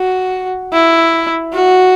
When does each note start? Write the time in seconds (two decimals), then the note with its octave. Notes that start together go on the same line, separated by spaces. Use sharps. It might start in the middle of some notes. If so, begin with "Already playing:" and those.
Already playing: F#4
0.73 E4
1.53 F#4